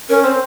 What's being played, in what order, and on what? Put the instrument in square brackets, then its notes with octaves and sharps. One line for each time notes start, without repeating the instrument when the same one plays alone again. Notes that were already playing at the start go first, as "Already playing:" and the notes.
[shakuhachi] C#4 [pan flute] A#4
[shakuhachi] C4 [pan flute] C5